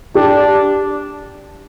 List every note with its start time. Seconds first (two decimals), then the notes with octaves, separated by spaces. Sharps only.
0.15 D4 G4